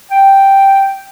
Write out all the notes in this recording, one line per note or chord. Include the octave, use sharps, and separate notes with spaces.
G5